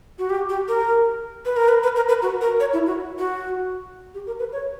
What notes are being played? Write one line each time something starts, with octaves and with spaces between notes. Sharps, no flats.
F#4
G4
G4
A#4
B4
A#4
B4
B4
A#4
B4
F#4
A#4
C#5
E4
F#4
F#4
G4
A#4
B4
C#5